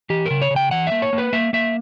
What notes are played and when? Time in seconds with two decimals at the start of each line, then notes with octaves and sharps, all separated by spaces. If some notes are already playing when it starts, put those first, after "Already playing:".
0.10 E3 G4
0.26 C#3 A#4
0.42 C#5
0.51 C#3
0.56 G5
0.71 E3 F#5
0.87 A#3 E5
1.02 C#5
1.13 A#3
1.18 B4
1.33 A#3 E5
1.53 A#3 E5